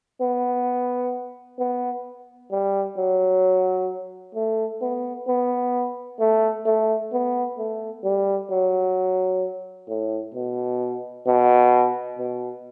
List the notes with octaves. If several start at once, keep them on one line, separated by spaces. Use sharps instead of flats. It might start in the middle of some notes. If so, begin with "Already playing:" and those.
B3
B3
G3
F#3
A3
B3
B3
A3
A3
B3
A3
G3
F#3
A2
B2
B2
B2